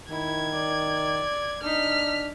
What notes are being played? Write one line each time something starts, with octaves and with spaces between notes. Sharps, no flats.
D#3 E4 G#6
D5
D4 D#4 F6 B6